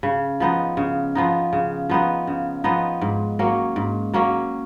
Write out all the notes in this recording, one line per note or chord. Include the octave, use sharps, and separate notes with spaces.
C#3
F3 B3 D#4
C#3
F3 B3 D#4
C#3
F3 B3 D#4
C#3
F3 B3 D#4
G#2
F#3 A#3 C#4
G#2
F#3 A#3 C#4